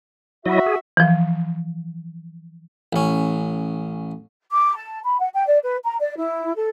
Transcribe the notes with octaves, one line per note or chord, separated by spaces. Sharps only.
F#3 E4 F#4 D#5 E5
G#4
E3 F3
A1 C#4
D6
A5
B5
F#5
G5
D5
B4
A#5
D5
E4
A4